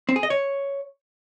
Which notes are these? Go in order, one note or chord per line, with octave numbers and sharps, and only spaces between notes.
C4
G#4
D#5
C#5